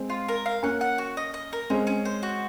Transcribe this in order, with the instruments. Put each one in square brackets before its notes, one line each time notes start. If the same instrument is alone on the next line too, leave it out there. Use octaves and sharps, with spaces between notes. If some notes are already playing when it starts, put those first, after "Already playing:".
Already playing: [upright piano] G#3 C4
[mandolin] F4
A#4
F5
[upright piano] A#3 C#4 [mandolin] F#5
[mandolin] F#5
F#4
D#5
D#5
A#4
[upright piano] G#3 C4 [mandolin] C#4
[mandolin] C#4
C5
F#4